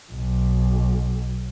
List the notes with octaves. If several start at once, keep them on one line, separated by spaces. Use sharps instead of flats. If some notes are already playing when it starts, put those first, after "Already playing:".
B1